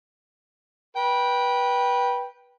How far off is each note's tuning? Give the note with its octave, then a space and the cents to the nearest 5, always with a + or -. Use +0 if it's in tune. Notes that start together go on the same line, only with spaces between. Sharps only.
B4 -20 G5 +0